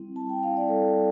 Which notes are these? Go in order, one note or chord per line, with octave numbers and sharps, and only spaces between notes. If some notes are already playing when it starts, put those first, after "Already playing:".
Already playing: G3 C4 E4
G3 A5
G5
C4 E4 F5
D5
G3 A4